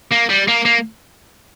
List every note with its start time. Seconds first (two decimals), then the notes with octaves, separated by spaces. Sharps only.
0.12 A#3
0.30 G3
0.48 A#3
0.65 A#3